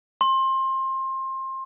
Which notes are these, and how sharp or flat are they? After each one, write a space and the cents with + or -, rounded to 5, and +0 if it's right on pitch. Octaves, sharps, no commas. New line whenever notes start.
C6 +25